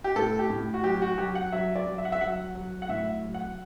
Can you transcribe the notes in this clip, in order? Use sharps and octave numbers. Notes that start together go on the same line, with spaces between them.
G4
A2 A4
G4
A2
F#4
F#3 G4
F#4
F#3 G4
F#5
F#3 E5
D5
F#3
E5
F#5
E5
F#3 F#5
F#3
F#5
A2 E5
F#3
F#5